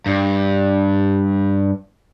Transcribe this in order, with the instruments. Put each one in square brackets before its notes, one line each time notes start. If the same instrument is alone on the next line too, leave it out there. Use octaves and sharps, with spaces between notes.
[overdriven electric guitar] G2